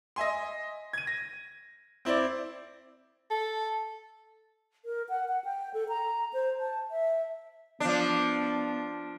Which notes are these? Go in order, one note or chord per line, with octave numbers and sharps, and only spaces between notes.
D#5 E5 G#5 C6
G#6 D#7
A#6
C4 E4 C5 D5
A4
A#4
F#5
F#5
G5
A4
A#5
C5
A5
E5
F3 B3 D4